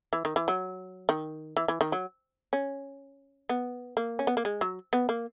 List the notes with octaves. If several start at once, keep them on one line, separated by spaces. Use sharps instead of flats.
E3
D#3
E3
F#3
D#3
E3
E3
D#3
F#3
C#4
B3
A#3
C#4
B3
A#3
G#3
F#3
B3
A#3